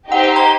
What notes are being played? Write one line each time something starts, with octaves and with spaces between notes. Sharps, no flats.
D#4 G4 C5 F#5
F#5
A#5